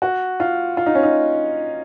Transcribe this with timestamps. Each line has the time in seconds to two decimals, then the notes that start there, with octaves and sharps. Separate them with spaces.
0.02 F#4
0.40 F4
0.77 F4
0.86 D#4
0.95 C#4
1.03 D#4